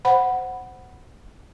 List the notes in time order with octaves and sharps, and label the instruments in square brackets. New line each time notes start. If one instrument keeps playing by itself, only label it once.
[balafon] C5 F#5 B5